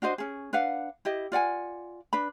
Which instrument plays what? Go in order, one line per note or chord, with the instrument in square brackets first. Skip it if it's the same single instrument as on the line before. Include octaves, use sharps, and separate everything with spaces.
[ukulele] D4 F#4 C5 D#5
C#4 G#4
D4 B4 F5 F#5
E4 G4 D#5
F4 D5 F#5 G#5
D4 B4 B5